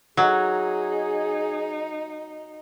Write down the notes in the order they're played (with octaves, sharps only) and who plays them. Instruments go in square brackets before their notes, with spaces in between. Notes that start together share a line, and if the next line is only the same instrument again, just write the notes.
[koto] F#3 [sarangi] D#4 [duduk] G#4